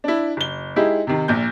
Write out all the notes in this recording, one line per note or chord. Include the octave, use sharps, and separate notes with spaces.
D4 E4
F#1 G7
G#3 D#4 E4 G4 G#4
C3 D#3
A#1 A#2 G6